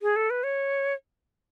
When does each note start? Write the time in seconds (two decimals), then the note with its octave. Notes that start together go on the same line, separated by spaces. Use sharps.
0.02 G#4
0.16 A4
0.30 B4
0.44 C#5